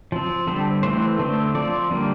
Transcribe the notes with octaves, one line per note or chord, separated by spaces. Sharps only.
F3 C4
D3 G3 C4 A4
E3 A3 C4 C5
D3 A3 C4
F3 C4 D5
D3 G3 A#3